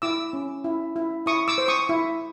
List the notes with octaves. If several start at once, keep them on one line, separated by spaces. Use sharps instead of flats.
E4 D6 E6
C#4
E4
E4
E4 C#6 D#6
D6 E6
C5
C#6 D#6
E4